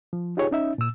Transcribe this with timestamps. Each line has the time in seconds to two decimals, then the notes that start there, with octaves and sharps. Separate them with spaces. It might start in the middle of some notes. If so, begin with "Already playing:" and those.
0.13 F3
0.37 D#4 F4 G4 G#4 C#5
0.51 C#4 D#4 E5
0.78 A#2 E6